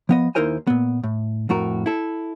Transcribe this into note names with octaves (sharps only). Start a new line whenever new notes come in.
F3 B3 D#5
D#2 D#4 E4 A#4 C5 G#5
A#2 B3
A2
F2 A2 F#4 A#4
E4 A4